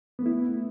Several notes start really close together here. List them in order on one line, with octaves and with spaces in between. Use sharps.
B3 A3 E4